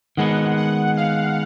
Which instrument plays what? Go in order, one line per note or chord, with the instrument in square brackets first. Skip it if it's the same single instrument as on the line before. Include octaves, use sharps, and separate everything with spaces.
[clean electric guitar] D#3 G#3 B3 [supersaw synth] F#5
[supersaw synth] F#5
F5